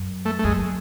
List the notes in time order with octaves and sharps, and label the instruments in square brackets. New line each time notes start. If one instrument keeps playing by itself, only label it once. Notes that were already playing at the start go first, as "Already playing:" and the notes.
Already playing: [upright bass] F#2
[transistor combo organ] A3
A3
[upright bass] F#2 [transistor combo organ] G#3